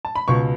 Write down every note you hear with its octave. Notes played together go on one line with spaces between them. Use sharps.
A5
B5
C#2 B2 B3 C#6